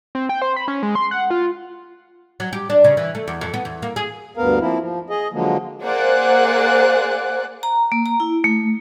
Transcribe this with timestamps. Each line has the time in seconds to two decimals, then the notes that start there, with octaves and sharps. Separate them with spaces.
0.15 C4
0.29 G5
0.42 C5
0.56 B5
0.68 C#4
0.83 G#3
0.95 C6
1.11 F#5
1.30 F4
2.40 F#3
2.53 G4
2.70 D4
2.84 C#3
2.97 E3
3.15 A3
3.28 E2
3.41 F2
3.54 B3
3.65 E2
3.82 A#3
3.96 G#4
4.37 D2 G2 B3 A#4 F5
4.60 F3 A#3 C4 E4
4.79 F3
5.10 G#4 D#5
5.32 D3 F3 F#3 G#3 A#3
5.84 A#3 G#4 C5 D5 F#5 F#6
7.63 A#5
7.92 A#3
8.06 A#5
8.20 E4
8.44 A3